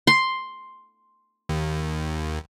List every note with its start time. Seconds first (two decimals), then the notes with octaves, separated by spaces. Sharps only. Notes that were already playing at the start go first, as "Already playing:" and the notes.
0.07 C6
1.49 D#2